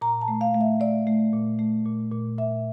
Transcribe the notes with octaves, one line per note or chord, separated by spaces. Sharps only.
A#2 A#5
A5
A3
F5
A3
E5
A3 D5
A3
A#2
A3
A#2
A#2
A#2 E5